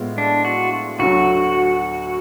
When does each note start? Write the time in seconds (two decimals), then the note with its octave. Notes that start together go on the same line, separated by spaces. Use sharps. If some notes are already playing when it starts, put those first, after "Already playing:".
Already playing: A2 G#3 B3 F4
0.18 D4
0.45 F#4
0.99 D2 D3 F#3 F#4